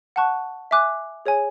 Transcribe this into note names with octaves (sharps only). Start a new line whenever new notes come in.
F#5 A5 C#6 F#6
E5 G#5 D6 F#6
G#4 C#5 G#5